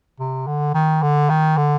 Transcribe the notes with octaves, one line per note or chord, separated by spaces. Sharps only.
C3
D3
D#3
D3
D#3
D3